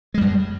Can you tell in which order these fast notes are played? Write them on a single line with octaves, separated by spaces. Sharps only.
G#3 G3 F#2